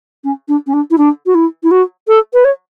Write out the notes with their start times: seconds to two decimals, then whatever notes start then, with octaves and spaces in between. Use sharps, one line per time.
0.24 C#4
0.48 D4
0.66 C#4
0.73 D4
0.90 E4
0.97 D4
1.26 F#4
1.34 E4
1.63 E4
1.71 F#4
2.07 A4
2.33 B4
2.44 C#5